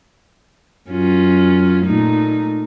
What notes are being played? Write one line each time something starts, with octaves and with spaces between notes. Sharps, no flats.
F#2 C#4 F4
A#2 A3 D#4